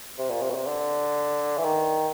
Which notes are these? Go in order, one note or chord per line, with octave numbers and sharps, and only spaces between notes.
C3
A#2
C3
B2
C3
D3
E3
D#3